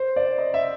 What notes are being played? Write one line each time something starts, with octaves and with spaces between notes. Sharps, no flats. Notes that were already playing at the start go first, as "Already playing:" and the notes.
Already playing: C5
D5
D#5
E5